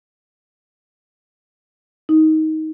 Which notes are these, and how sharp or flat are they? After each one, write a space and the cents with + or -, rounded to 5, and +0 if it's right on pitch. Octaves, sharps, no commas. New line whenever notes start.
D#4 +15